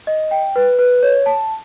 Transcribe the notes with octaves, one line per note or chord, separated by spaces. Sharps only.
D#5
G5
B4
B4
C#5
A5